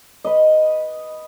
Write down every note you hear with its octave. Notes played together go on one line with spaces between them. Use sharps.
B4 D#5